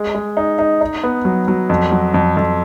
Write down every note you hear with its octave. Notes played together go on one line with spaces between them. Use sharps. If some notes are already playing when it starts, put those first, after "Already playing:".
Already playing: G#3
G#3
D#4
D#4
D#4
B3
F#3
F#3
F2
F#3
F2
F2